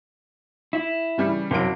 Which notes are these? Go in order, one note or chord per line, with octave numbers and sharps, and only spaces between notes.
E4
C#3 E3 G3
F#1 C3 F#3 A#4 D7